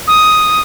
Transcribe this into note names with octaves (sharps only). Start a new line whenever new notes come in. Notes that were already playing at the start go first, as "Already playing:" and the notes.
D#6